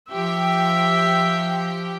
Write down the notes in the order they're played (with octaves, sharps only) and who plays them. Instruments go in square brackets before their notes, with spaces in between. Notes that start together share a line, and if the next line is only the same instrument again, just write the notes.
[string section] F3 G4 G5 [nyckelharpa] E5